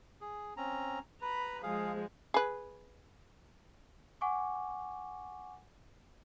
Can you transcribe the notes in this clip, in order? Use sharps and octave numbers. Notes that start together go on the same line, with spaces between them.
G#4
C4 C#4 A#5
B4 A#5 B5
F3 G#3 G#4 F5
G#4 B4
F#5 G#5 C#6 D6